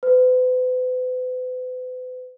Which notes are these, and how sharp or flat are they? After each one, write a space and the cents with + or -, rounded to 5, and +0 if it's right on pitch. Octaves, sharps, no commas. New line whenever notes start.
B4 +40